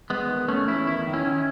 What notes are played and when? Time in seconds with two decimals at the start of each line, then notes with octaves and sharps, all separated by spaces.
0.10 E2 G#3 B3
0.30 D#3
0.48 E2 A3 C#4
0.68 E2 C#4 E4
0.87 D#3 E4
1.07 D#3
1.13 C#4 E4
1.27 D#3